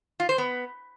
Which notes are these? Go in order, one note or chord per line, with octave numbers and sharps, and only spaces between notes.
F4
C5
B3